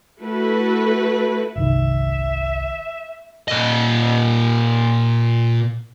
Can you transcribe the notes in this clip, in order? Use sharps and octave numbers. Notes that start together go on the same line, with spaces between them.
A3 E4 F#4 A4 B4
G1 C2 D#3 E5
A#2 D#5